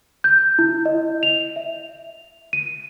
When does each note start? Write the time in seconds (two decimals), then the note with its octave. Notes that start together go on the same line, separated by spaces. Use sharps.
0.24 G6
0.59 E4
0.86 D#5
1.23 F7
1.56 E5
2.53 D#7